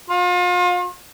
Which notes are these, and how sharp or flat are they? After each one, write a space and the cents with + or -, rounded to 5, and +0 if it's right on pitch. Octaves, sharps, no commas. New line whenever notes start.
F4 +35